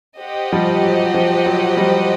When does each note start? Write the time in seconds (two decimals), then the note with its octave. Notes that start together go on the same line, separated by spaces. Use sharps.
0.21 G4 C5 D#5 F#5
0.52 F3 G3
0.83 F#3
1.14 F3
1.46 F#3
1.77 F3 G3